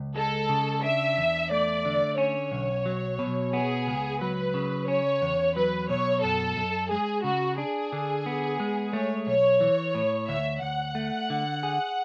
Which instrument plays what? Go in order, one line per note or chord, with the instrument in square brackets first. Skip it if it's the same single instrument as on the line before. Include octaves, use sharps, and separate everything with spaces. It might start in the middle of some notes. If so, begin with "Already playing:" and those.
Already playing: [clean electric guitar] C#2
[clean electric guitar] G#3 [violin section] A4
[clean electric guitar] C#3
[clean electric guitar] D4 [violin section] E5
[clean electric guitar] E2
[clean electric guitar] A3 [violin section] D5
[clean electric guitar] D3
[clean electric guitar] C#4 [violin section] C#5
[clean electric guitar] B1
F#3
B2
[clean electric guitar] B3 [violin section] G#4
[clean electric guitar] C#2
[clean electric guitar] F#3 [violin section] B4
[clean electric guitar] C#3
[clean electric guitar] C#4 [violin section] C#5
[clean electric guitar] E2
[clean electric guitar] F#3 [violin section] B4
[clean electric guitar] B2 [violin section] C#5
[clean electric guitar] F#2 [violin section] A4
[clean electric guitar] F#2
[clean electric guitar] G#3 [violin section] G#4
[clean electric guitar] C#3 [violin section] F#4
[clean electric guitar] D4 [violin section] G#4
[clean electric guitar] D3
B3
G#3
[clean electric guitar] A3 [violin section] C#5
[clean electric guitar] B1 [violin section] C#5
[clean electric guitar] E3
A2
[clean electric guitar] D2 [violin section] E5
[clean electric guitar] D2 [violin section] F#5
[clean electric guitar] A3
D3
G#4